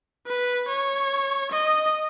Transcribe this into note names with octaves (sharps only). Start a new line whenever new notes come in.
B4
C#5
D#5